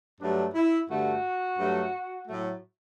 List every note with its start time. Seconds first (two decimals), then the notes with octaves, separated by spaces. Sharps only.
0.20 G2 F#3 A3 D4
0.54 E4
0.89 G2 D3 A3 F#4
1.57 G2 F#3 A3
2.27 A2 F#3 A3